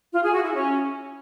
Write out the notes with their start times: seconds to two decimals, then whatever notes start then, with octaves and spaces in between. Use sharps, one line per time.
0.13 F4
0.23 G#4
0.33 F#4
0.43 E4
0.53 C#4